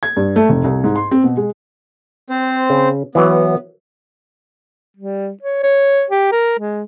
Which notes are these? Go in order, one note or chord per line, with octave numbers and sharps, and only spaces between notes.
G#6
G2
A3
F1
C2
G#2
C6
C4
B2
G#3
C4 C5
C#3
E3 F#3 B3
G3
C#5
C#5
G4
A#4
G#3